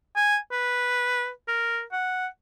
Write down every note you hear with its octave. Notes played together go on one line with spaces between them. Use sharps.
G#5
B4
A#4
F#5